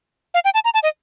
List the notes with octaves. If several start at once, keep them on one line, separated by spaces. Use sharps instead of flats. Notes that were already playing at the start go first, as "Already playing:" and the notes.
F5
G5
A5
A#5
A5
D#5